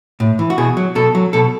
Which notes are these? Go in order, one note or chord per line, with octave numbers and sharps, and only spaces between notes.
A2
E3
F#4
B2 G#4
F#3
B2 A4
F#3
B2 A4